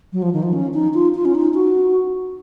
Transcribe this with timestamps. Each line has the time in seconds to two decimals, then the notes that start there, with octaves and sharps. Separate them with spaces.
0.13 F#3
0.22 F3
0.33 D#3
0.43 F3
0.53 C#4
0.74 D#4
0.94 F4
1.15 F4
1.25 C#4
1.35 D#4
1.54 F#4